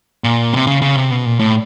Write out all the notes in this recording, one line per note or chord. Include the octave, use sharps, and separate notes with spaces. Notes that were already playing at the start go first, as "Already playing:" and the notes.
A#2
C3
C#3
C#3
C3
B2
A#2
A2